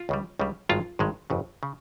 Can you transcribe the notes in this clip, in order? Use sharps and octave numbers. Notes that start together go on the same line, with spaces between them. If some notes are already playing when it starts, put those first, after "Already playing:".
Already playing: F4
C#2 C#3 G3
C#2 C#3 G3
G#1 G2 D#3 G#3 F4
G#1 G2 D#3 G#3
G1 F2 C#3
C#3